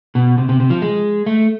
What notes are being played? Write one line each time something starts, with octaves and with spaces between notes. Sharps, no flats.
B2
C3
C3
C3
F3
G#3
A3